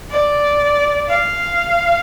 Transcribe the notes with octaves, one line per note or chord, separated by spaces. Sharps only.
D5
F5